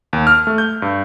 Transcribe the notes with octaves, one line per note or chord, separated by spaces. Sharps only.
D#2
F6
A3
G6
G2